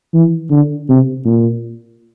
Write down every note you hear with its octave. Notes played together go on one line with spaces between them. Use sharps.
E3
D3
C3
A#2